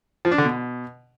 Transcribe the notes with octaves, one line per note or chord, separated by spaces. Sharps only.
F3
D4
D3
B2